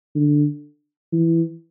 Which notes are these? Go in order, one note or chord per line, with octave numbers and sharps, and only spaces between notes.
D3
E3